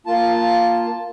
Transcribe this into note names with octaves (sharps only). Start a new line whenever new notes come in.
A#3 F4 A5